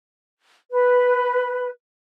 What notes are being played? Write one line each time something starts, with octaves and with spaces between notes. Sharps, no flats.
B4